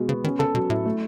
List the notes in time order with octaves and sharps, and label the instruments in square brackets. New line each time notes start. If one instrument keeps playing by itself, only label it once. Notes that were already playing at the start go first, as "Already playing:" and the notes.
Already playing: [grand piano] B2 G#3 F#4
[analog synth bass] C#3 [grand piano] B3
[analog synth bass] D#3 [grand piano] C#4
[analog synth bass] C#3 [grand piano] A4
[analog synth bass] B2 [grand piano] F#3
[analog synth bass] A2 [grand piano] E4
[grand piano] A3